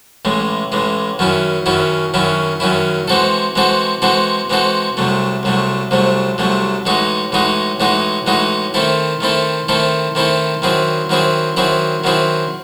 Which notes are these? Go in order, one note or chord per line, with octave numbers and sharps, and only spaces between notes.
A1 A2 E3 G#3
A1 A2 E3 G#3
F#2 D#3 F#3 C#4 E4
F#2 D#3 F#3 C#4 E4
F#2 D#3 F#3 C#4 E4
F#2 D#3 F#3 C#4 E4
E3 G#3 C4 F#4 A4
E3 G#3 C4 F#4 A4
E3 G#3 C4 F#4 A4
E3 G#3 C4 F#4 A4
C2 C3 F#3 A3
C2 C3 F#3 A3
C2 C3 F#3 A3
C2 C3 F#3 A3
A2 E3 G#3 D#4 F#4
A2 E3 G#3 D#4 F#4
A2 E3 G#3 D#4 F#4
A2 E3 G#3 D#4 F#4
D#3 A3 C4 E4 A4
D#3 A3 C4 E4 A4
D#3 A3 C4 E4 A4
D#3 A3 C4 E4 A4
D#3 F#3 C4 E4 G#4
D#3 F#3 C4 E4 G#4
D#3 F#3 C4 E4 G#4
D#3 F#3 C4 E4 G#4